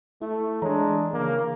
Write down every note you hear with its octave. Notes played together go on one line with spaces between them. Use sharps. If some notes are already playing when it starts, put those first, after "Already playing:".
A3 E4
E3 G#3 D4 C#5 A#5
C#3 E3 A#3